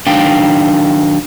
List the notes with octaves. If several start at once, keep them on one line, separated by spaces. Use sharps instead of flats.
D#3 F#3 D4 F5 G5